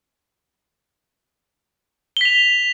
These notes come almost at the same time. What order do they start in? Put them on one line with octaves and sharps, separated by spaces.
G7 B6 F7